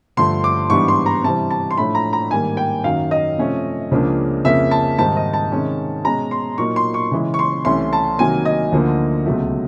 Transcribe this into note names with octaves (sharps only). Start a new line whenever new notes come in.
G2 D3 F3 A3 C6
D6
G#2 E3 G3 B3 D4 C#6
C6
A#5
C3 E3 G3 C4 A5
A5
C6
A2 F3 A3 D4 B5
A#5
A#5
G#2 D#3 G3 A#3 G#5
G5
F#2 D#3 F#3 F5
D#5
C3 F3 A3 C#4
C#2 C#3 F3 A#3 D4
F2 C#3 F3 A#3 E5
A5
G#2 D#3 G3 C4 D#4 A5
D#5
A5
C3 D#3 G#3 C#4
B2 G#3 C#4 A#5
C6
A#2 F#3 A#3 D#4 C#6
C6
C#6
C#3 E3 G#3
C#6
C6
C2 C3 E3 A3 C#4 C6
A5
C3 D#3 F#3 A#3 G#5
D#5
D2 D3 F3 A#3 D#4
C#2 B2 F#3 A3